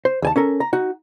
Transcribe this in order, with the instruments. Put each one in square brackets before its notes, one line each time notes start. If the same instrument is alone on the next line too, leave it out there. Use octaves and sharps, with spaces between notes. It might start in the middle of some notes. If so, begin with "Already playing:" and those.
[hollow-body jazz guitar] C5
D#2 G#5 A5
C#4 A4 A#4
A#5
D#4 F#4